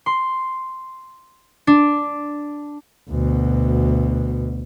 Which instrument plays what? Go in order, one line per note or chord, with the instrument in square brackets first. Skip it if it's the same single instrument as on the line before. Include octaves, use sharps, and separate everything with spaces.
[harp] C6
D4
[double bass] D2 B2